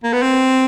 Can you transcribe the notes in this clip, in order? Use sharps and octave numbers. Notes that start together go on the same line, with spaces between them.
A#3
B3
C4